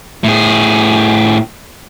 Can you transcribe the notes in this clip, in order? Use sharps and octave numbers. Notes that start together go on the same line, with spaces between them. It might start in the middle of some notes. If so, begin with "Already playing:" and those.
A2 G#4